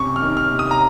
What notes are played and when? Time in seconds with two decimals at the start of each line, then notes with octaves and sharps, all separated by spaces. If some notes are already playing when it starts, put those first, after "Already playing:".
Already playing: F#2 C3 C#6
0.16 F6
0.22 D#3
0.37 F6
0.52 C3
0.59 D#6
0.71 A#5